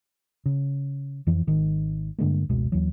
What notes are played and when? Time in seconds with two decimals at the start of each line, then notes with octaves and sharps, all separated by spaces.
0.46 C#3
1.27 F2 E3 F3
1.47 G#1 D#3
2.18 G2 D3 G#3 A#3
2.49 F1 C#2 B2 G#3
2.72 D#2 E3 F#3